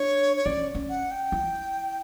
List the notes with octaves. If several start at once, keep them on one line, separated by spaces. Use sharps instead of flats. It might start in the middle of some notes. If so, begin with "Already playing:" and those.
Already playing: D4 C#5
C#5
C#4 D5
C#4
F#5
G5
E4